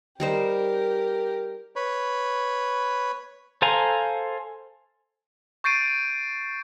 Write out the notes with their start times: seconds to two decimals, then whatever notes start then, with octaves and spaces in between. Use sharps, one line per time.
0.20 G3 D#4 G4 A#4 C5
1.76 B4 C#5 B5
3.62 A4 C5 F5 G#5 A#5
5.64 C#6 G6 A6 C7 D7 D#7